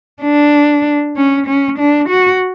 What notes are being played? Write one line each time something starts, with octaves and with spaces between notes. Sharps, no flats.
D4
C#4
C#4
D4
F#4